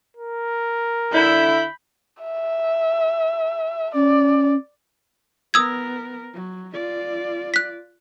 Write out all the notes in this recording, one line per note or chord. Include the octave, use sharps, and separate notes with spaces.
A#4
D3 E4 B5 G6
E5
C#4 D5
B3 A#4 D#6 E6 G#6
F#3
F4 D5
F#6 B6